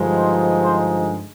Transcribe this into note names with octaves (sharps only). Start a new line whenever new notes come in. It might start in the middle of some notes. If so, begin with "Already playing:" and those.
Already playing: G2 D3 F3 G#3 D#4
C5
C5